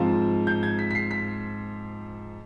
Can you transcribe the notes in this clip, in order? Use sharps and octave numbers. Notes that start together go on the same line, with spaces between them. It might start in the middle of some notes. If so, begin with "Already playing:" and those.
Already playing: G#2 F3 C4 F4
G6
G#6
B6
B6
C7
B6